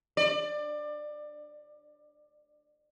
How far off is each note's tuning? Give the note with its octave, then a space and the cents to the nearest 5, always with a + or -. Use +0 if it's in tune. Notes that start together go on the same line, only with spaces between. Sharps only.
D5 +25